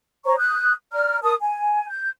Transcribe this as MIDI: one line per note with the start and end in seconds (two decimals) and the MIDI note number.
0.25 0.36 72
0.25 0.36 73
0.25 0.36 82
0.25 0.36 85
0.38 0.73 87
0.38 0.73 90
0.38 0.73 91
0.93 1.19 74
0.93 1.19 82
0.93 1.19 89
1.23 1.34 70
1.23 1.34 81
1.23 1.34 87
1.40 1.86 80
1.87 2.09 91